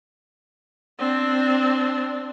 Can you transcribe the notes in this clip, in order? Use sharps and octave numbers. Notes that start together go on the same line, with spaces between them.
C4 D4